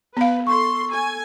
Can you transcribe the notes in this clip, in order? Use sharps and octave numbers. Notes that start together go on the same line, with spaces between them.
B3 B4 F5
A4 C6 C#6
A4 G#5